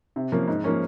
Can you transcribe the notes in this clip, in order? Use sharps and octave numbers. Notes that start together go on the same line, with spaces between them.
C3
F3 A#3 C#4
G#2
F3 A#3 C#4